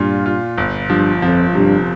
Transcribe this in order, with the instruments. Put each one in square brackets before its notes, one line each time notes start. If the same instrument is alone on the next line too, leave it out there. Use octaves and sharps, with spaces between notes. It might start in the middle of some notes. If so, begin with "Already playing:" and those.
Already playing: [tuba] G2 [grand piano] A#2 F4
[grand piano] F4
G1
[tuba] G2 [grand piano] F3
[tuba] F2 [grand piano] F3
[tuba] G2 [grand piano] C3